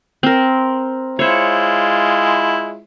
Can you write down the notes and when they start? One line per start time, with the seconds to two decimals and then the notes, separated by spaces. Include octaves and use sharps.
0.23 C4 A#4
1.19 G#3 E4 F4 C5 C#5